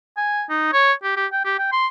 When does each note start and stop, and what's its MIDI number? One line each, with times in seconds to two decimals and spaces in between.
0.17 0.44 80
0.50 0.70 63
0.73 0.93 73
1.03 1.16 67
1.16 1.26 67
1.32 1.42 79
1.45 1.54 67
1.59 1.69 79
1.72 1.87 84